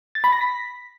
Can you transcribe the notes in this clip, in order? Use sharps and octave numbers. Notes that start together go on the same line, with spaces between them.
A6
B5
A#6
B6